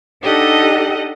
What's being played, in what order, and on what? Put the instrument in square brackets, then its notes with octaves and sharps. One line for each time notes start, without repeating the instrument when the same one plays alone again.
[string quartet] D4 D#4 G4 A4 D#5 F#5